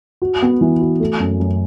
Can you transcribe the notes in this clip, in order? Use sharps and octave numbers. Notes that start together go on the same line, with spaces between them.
F#4
B3
E3
F#4
A3
F#2
F#2